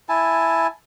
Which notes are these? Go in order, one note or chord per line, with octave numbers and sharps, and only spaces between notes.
E4 G#5 A5